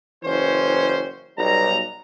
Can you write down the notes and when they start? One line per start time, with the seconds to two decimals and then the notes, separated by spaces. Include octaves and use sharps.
0.24 F#1 E3 C#4 C5
1.37 B1 G3 A#5